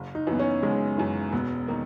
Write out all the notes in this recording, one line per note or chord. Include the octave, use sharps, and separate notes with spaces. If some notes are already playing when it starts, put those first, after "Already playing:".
Already playing: F#1
D#4
F#2 E3 B3
C#4
F#1 G#3
F#2 E3
E1 B3
D#3 A#3